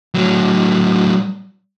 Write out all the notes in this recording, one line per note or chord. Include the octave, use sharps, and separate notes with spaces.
A2 F#3